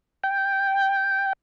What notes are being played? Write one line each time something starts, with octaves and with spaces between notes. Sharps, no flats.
G5